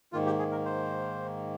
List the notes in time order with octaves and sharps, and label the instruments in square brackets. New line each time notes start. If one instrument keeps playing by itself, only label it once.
[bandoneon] G#2 D#3 A#3 F4
G4
G#4
A#4
C5